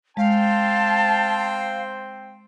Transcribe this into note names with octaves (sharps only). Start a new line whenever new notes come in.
G#3 C4 C5 F5 G5 A5